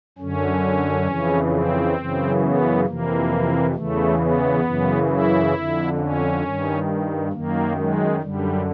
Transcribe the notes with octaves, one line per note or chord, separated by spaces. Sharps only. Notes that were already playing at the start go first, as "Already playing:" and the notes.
F#2 D3 C#4
F2 C#3 E3
C4
F#2 C#3 E3
B3
F2 C3 E3 A#3
E2 C#3 E3 A3
B3
F#2 C#3 E3
E4
F2 D3
C#4
G2 D#3
F#2 D#3 A#3
G#3
F#2 D3 G3